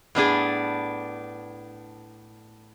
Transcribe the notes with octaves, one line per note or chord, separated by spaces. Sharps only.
A2 B3 D4 G#4